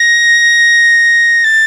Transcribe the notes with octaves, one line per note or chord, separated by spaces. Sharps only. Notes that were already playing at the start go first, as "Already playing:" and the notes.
Already playing: A#6
A6